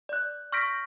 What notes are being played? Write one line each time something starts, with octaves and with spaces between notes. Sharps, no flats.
D5 F#6
C#6 F6 G6 A#6 B6 D7